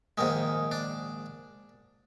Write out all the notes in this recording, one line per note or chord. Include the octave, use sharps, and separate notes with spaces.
A#1 G#2 D#3 G#3
D4